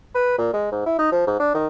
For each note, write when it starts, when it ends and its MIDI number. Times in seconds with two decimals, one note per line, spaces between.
0.15 0.36 71
0.38 0.50 46
0.53 0.67 56
0.72 0.85 44
0.86 0.95 64
0.99 1.09 63
1.12 1.25 53
1.27 1.39 44
1.39 1.50 62
1.54 1.67 51